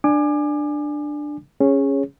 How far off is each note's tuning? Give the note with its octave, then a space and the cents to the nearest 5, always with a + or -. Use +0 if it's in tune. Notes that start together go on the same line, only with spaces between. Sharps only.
D4 +10 G#5 +0 D6 +30
C#4 +0 G#4 -10 C#5 -10